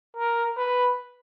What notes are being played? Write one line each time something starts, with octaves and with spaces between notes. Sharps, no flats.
A#4
B4